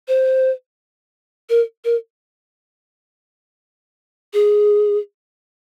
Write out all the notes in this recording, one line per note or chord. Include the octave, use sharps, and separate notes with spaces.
C5
A#4
A#4
G#4